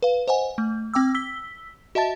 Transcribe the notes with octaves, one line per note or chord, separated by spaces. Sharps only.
B4 F5
C5 D#5 F#5 G#5
A3
C4 G5 D6 E6
E6 B6 G7
F#4 D#5 E5 A5 A6